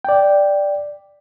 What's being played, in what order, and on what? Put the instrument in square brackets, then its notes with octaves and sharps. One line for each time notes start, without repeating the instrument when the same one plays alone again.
[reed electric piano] D5 G5